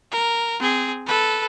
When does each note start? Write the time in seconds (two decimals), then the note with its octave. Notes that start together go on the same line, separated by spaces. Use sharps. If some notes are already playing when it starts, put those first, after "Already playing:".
0.12 A#4
0.60 C4 G#4
1.07 A4 B4